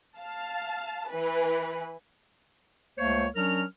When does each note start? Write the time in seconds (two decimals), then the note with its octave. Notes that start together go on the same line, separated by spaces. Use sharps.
0.18 F5 A5
1.09 E3 B4
2.98 C#2 A3 A#3 C5 C#5
3.36 F#3 C#4 D4 A#4 F6